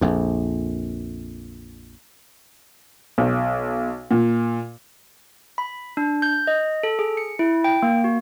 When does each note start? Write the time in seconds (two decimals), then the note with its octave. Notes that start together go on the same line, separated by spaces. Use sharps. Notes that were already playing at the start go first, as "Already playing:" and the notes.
0.01 A#1 F2
3.18 B1
4.11 A#2
5.58 B5
5.97 D4
6.22 G6
6.47 D#5
6.83 A4
6.99 G#4
7.17 C#7
7.39 E4
7.64 G5
7.82 A#3
8.04 F#4